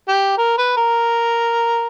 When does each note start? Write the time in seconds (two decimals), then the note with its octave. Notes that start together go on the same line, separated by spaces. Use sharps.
0.08 G4
0.38 A#4
0.58 B4
0.77 A#4